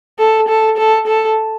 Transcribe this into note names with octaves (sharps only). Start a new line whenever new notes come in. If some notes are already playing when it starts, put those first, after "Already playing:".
A4
A4
A4
A4